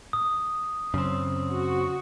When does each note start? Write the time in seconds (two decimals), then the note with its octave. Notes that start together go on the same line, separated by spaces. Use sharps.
0.13 D#6
0.94 F#2 C#3 C4
1.51 F#4